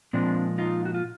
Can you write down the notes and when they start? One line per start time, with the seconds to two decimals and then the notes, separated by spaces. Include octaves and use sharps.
0.13 A#2 F3 G#3 C4 D4
0.58 D#4 F4
0.85 F#4
0.94 F4